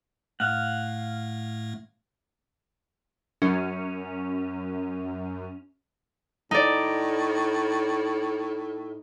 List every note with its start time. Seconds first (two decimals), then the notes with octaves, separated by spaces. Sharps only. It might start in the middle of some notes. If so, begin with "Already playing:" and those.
0.40 A2 A3 F5 F#5
3.42 F#2 C#4
6.51 A2 D#4 D5